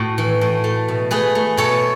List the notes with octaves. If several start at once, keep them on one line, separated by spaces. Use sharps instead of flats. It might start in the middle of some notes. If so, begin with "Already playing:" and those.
Already playing: A2 F#4 A4
E3
A2
A3
B2
A3 G#4 B4
A3
B2 A4 C#5